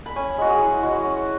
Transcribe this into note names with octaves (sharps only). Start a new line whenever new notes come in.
B5
C#4 G#5
G#3 F#4
G#4
E4
G#3 F#4
C#4